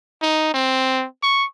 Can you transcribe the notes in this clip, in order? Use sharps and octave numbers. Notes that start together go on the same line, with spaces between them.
D#4
C4
C#6